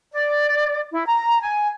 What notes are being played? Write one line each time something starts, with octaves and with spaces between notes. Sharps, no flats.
D5
E4
A#5
G#5